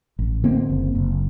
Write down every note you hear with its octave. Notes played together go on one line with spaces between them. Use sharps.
A1
D3 A#3 C4
F#1
F#1